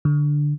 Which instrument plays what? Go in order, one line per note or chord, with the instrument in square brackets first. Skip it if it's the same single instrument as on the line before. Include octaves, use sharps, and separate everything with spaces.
[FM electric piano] D3